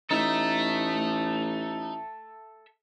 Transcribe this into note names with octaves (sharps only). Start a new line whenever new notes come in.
A1 D#4 A4 E5